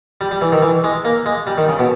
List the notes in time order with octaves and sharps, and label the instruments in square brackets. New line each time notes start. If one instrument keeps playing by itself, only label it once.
[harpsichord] G3
G3
E3
D#3
E3
G#3
A#3
G#3
G3
D#3
C#3
B2